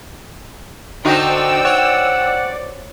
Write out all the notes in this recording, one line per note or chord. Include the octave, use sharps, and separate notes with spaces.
D3 D#4 F#4 C5 D5 G5 E6
C#5 F#5